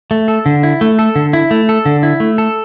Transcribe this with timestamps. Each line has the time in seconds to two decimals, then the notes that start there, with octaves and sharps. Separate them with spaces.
0.11 A3
0.28 A4
0.46 D3
0.63 E4
0.81 A3
0.99 A4
1.16 D3
1.33 E4
1.51 A3
1.69 A4
1.86 D3
2.03 E4
2.20 A3
2.38 A4